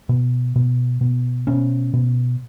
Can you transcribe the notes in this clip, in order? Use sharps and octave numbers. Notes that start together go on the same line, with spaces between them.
B2
B2
B2
B2 C#4
B2